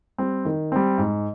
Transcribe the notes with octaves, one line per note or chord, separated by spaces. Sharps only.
G3 C4
D#3
G3 C4
G#2